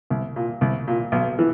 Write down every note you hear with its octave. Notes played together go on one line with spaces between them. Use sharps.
C2
A#2
C2
A#2
B1
E3